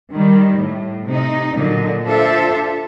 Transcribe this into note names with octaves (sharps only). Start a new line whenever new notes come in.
D#3 G3
A2
C3 D#4
A#2 D3 F#3 D#5
D4 F4 A4 C5 E5